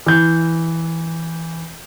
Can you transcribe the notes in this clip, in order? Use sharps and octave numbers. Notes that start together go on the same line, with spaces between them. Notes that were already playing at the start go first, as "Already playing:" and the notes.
E3 G6